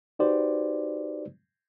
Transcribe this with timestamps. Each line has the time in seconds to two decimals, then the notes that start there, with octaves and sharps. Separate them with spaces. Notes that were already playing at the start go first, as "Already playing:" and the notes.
0.19 D#4 F#4 G4 B4 C5 D5